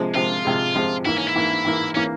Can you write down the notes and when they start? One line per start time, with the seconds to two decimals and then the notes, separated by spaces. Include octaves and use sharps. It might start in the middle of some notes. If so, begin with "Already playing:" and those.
Already playing: C3 F3 G#3
0.15 C3 F3 G#3 F4
0.45 C3 F3 G#3
0.74 C3 F3 G#3
1.05 G#2 E3 A#3 E4
1.17 C#4
1.27 E4
1.36 G#2 E3 A#3
1.65 G#2 E3 A#3
1.95 E3 A#3 C#4